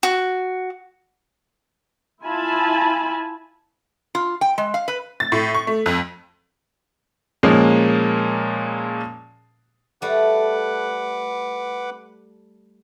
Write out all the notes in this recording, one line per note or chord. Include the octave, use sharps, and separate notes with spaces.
F#4
E4 F4 G#5 A5 B5
F4
G5
G#3
F5
B4
A6
A2
C#6
A3
F2
A#2 F3 G#3 A#3 C#4
G3 A3 B4 F#5 D6